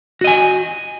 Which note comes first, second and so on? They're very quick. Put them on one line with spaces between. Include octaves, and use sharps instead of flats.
F#4 D#5 G#5